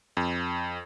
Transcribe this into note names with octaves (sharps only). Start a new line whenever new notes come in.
F2